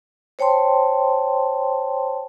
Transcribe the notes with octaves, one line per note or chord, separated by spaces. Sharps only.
C5 C#5 G5 A5 C6